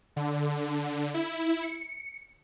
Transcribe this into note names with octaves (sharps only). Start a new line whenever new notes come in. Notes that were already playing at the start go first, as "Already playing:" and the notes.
D3
E4
C#7